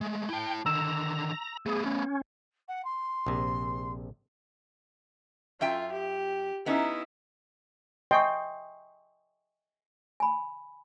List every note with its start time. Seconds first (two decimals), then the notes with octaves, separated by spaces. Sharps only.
0.01 G#3 A3
0.29 E4 G5 A5
0.66 D3 D#3 A#5 E6 E7
1.66 A3 B3 G#4
1.86 C#4
2.68 F#5
2.84 C6
3.26 A#1 C3
5.61 F#2 F4 E5 G5
5.92 G4
6.66 B3 C#4 D#4 E4
8.11 D#5 E5 G5 G#5 C6 C#6
10.20 G#5 B5